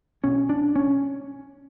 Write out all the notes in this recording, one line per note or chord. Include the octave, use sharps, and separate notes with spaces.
B1 B2 C#4
D4
C#4